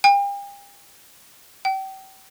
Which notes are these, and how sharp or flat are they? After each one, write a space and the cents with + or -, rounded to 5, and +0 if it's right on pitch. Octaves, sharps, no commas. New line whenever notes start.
G5 +40
G5 -35